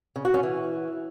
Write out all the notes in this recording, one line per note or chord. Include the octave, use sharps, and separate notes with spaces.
C#3
F#4
C#4
E3